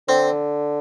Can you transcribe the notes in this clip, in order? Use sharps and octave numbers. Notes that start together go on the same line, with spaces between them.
D3 C4